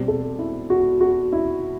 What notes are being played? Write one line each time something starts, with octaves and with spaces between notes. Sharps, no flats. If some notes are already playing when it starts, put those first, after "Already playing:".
Already playing: B2 G3 C4 G4
A4
E4
F#4
F#4
E4